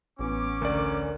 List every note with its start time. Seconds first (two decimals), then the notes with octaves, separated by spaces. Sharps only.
0.19 A1 B3 C#4 D6
0.62 D2 A#4 D5